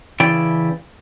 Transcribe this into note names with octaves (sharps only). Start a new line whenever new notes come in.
C#3 E3 E4 D5 G5